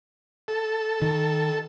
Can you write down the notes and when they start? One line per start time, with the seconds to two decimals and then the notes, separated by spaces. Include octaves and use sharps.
0.48 A4
1.02 D#3